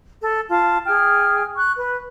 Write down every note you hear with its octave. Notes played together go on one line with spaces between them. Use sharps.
A4
F4 A5
G#4 G5 F6
C#6 F#6
B4